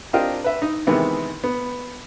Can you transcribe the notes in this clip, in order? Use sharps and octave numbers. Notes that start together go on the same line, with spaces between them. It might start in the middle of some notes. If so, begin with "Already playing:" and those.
C4 D4 F4 G4 A#4 D#5
B4 E5
D#4
C3 D#3 E3 G#3 B3
B3